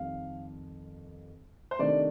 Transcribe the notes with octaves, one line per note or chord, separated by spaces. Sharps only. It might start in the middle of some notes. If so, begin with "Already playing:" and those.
Already playing: F2 D#3 G3 C4 F5
C5
C3 D#3 A3 D4 D5